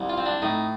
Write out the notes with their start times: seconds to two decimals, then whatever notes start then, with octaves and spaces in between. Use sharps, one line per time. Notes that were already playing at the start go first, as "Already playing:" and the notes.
Already playing: C2
0.09 F4
0.18 C4
0.26 D4
0.42 A2 D#4